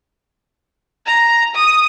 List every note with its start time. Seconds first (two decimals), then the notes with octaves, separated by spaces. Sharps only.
1.06 A#5
1.55 D#6